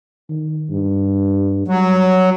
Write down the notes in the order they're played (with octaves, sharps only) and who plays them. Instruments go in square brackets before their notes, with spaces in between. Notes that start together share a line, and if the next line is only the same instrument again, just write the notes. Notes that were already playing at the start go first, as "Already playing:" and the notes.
[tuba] D#3
G2
[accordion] F#3 [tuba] G3